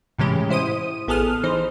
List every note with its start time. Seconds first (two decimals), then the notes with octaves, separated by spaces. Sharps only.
0.18 A2 C3 E3 G#3 C#4 G4
0.49 G#2 E4 C5 D#6 D#7
1.08 A1 B3 G#4 A4 D#6 F6
1.43 E3 D#4 C5